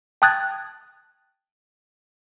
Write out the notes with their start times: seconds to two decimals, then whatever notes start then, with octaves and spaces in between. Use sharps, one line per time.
0.22 G5 A5 D#6 F#6 G#6 A6